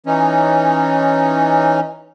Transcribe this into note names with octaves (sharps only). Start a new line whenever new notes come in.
E3 C#4 D#4